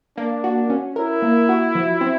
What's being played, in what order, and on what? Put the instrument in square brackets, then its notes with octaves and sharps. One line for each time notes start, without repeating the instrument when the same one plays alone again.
[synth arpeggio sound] A#3 [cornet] D4
[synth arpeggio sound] F#4
C#4
[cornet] E4 [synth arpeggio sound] A#4
[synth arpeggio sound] A#3
F#4
F3
C4